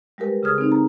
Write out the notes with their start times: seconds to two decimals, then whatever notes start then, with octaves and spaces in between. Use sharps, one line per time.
0.18 G3 G#3 G4 A#4 B4
0.43 C#3 G#4 D#6 F6 G#6
0.58 C4 D#4
0.72 A#5